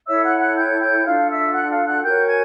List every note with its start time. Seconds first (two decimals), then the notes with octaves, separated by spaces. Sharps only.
0.07 E4 A4 C#5 E5 E6
0.24 F#5 F#6
0.39 F#5 F#6
0.57 G5 G6
0.81 G5 G6
1.04 D4 F4 A4 F5 F6
1.29 E5 E6
1.53 F#5 F#6
1.70 F5 F6
1.85 F#5 F#6
2.02 F#4 A#4 C#5 G5 G6
2.26 G#5 G#6